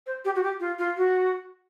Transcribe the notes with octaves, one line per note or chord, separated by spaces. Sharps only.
C5
G4
F#4
G4
F4
F4
F#4